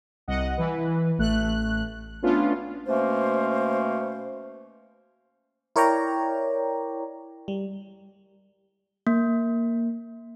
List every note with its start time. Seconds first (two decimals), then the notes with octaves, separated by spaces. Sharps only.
0.28 C2 D#5 F#5
0.58 E3 B4
1.18 A1 A3 F#6
2.22 A3 B3 C#4 D4 F4
2.87 B2 A3 A#3 C#4 C5
5.76 E4 A#4 C#5 D5 G5 A#5
7.48 G3
9.07 A#3